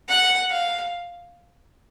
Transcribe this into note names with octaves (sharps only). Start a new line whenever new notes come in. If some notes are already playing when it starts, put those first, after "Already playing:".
F#5
F5